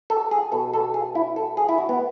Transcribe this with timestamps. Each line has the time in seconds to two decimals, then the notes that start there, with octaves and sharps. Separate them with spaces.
0.10 A4
0.31 G#4
0.52 B2 A4
0.73 A4
0.94 G#4
1.15 E4
1.36 A4
1.57 G#4
1.69 E4
1.78 F#4
1.89 B3